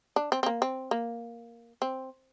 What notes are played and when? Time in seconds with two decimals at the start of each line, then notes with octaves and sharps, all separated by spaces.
0.16 D4
0.32 C4
0.43 C4
0.46 A#3
0.62 C4
0.91 A#3
1.82 C4